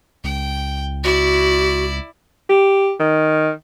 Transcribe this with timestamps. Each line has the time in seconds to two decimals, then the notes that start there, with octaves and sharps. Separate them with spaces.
0.24 C#2 G5
1.04 E4 F#4 D5
2.49 G4
3.00 D#3